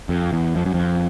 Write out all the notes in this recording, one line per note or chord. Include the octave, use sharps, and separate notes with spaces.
F2
E2
F2
F#2
F2